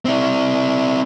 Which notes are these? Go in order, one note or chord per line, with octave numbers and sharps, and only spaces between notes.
C4 E4